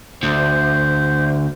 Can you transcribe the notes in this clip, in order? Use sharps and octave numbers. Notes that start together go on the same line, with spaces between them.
D2 C5